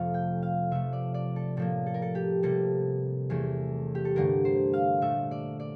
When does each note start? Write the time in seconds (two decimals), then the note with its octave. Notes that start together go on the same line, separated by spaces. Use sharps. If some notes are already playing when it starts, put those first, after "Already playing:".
Already playing: F2 C3 F3 A3 F5
0.14 G5
0.43 F5
0.71 C3 F3 A3 E5
0.93 D5
1.14 D5
1.36 A4
1.57 A2 F3 A#3 A4
1.86 A4
1.94 A#4
2.02 A4
2.15 G4
2.43 C3 G3 A#3 A4
3.30 E2 E3 A3
3.95 G4
4.05 A4
4.16 G2 D3 A3 A#4
4.45 C5
4.73 F5
5.01 A#2 A3 E5
5.31 D5
5.60 D5